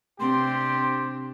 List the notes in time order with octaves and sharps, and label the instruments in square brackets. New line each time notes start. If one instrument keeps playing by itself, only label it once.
[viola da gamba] C3 C4 D4 [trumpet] G4 [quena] C6